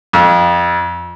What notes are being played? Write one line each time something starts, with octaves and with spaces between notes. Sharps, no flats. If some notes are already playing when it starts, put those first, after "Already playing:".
F2